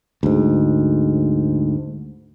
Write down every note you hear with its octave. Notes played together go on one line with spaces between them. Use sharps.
D2 G#2